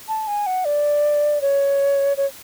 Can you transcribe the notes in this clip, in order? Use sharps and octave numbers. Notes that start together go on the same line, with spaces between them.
A5
G#5
F#5
D5
C#5
C#5